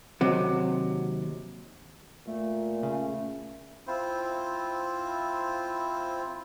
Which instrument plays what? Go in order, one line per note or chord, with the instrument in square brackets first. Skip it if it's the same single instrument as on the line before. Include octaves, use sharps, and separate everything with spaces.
[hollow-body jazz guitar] D#2 C3 F#3
[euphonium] A#2 [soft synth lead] A3
[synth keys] C#3 [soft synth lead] A3
[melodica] C4 E4 F4 C5